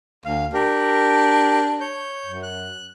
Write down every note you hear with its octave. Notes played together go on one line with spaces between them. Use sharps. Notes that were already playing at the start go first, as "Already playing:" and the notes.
D2 F5
D4 G4 A#4
C#5 G6
F#2
F#6